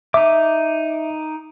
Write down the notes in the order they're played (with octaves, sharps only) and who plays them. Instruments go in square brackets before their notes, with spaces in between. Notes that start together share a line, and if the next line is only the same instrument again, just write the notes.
[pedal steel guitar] D#4 D6 [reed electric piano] E5